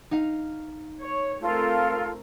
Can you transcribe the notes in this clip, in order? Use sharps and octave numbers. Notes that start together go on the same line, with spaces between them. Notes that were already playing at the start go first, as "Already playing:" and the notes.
D#4 F5
C#5
A3 C4 F4 A4 A#4